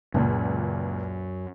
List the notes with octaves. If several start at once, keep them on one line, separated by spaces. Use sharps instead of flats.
C#2 F#2 A#2